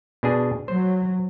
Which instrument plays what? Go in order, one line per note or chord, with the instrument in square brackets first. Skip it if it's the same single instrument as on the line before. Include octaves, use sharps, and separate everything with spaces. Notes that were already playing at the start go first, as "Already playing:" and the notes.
[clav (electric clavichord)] B2 D4 G#4
[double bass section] F#3 [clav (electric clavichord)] C5